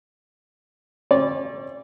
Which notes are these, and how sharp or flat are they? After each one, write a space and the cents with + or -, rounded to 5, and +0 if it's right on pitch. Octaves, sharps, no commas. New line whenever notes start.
C#4 -45 D5 -15